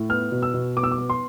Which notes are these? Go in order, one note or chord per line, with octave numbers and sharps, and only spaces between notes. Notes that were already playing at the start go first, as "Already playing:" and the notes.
Already playing: A2
B3 F6
B2
E6
B2
B3 D6
E6
D6
B3
C6